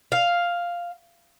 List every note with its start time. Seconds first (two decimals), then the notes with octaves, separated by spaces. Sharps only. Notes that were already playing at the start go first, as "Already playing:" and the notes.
0.12 F5